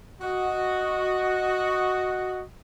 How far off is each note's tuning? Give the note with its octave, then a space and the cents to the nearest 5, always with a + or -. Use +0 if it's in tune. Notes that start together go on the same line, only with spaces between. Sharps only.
F#4 +0 D#5 +0